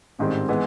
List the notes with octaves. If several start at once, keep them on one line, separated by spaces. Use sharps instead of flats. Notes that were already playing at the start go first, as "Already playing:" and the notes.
A1 G#2 D#3 G3 C4
E3 G#3 B3 D#4